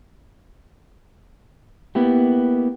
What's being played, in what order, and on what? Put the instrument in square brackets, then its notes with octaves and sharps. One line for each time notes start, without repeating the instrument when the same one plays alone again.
[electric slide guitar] A#3 B3 E4 G4